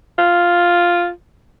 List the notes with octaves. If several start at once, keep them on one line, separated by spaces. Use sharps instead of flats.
F4